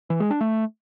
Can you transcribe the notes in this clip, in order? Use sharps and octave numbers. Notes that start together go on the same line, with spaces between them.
E3
G#3
D4
A3